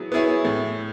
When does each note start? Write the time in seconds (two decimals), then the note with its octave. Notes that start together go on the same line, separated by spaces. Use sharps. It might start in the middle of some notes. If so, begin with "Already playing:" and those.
Already playing: F#3 B3 E4 G#4
0.12 B3 E4 G#4 C#5
0.45 A2